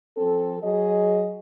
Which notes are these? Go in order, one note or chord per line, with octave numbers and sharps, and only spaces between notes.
F3 C4 A4
F#3 G#4 D#5